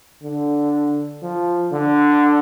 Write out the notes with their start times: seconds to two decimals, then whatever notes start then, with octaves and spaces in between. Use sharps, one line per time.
0.23 D3
1.22 F3
1.73 D3